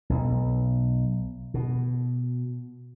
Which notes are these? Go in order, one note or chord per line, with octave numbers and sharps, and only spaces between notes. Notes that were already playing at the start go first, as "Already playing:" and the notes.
B1
B2